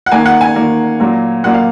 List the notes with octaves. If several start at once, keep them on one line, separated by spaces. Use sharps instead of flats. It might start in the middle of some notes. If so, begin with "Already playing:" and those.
F#5
D#3 A#3 G#5
F#5
G#5
D#3 A#3
A#2 F#3 A#3
A#2 F#3 A#3 F#5
F5